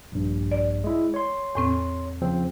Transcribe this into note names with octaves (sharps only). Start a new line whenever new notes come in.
A#1 G2
D5
G#3 E4
C#5 C6
E2 A2 C4
C#3 F3 C4